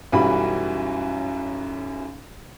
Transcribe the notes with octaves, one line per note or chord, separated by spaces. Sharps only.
B1 F#2 E3 G3 F#4 B5